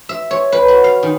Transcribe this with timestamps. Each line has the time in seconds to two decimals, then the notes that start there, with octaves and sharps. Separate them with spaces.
0.09 E5
0.31 C#5
0.52 B4
0.68 F#4
0.84 F5
1.03 D#3